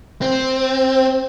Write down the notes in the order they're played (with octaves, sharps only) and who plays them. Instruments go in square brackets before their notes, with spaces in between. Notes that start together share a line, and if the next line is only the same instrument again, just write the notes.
[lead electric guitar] C4